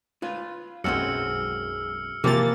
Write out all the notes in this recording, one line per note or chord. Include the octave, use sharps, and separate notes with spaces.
F4 B4
B1 F#2 G#3 C4 F#4 E6 F6 C#7
C3 E3 F3 A#3 A6